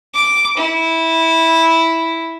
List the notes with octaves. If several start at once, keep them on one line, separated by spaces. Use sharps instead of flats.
D6
E4